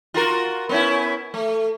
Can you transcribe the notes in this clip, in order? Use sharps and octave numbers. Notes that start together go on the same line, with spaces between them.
F4 F#4 A#4
B3 C#4 E4
A3